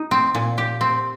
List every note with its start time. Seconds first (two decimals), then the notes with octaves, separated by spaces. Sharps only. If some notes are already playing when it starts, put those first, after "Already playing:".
Already playing: D#4
0.11 C4
0.35 A#2
0.58 G4
0.81 C4